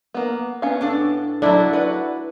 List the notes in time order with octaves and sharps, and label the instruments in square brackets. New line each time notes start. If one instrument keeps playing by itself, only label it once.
[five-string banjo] A#3 B3
B3 C#4 F5
[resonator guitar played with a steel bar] A2 D4 A4
[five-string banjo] F#3 D5 [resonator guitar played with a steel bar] A3 D#5 [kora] D4 E4
[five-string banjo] F#4 D5 [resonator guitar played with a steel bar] B4